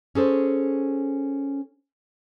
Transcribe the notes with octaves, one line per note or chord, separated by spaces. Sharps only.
C#4 G#4 A4 C5